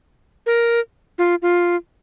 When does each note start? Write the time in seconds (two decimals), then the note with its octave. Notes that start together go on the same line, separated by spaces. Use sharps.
0.46 A#4
1.18 F4
1.42 F4